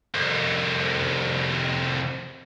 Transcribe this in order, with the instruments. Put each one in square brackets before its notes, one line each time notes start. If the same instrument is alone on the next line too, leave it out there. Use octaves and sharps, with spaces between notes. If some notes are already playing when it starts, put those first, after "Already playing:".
[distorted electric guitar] C2 F2